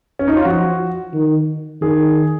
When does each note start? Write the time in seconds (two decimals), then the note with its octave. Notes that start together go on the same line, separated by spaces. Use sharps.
0.19 C#4
0.28 D#4
0.37 F4
0.45 F3 F#4
1.13 D#3
1.81 D#3 G#4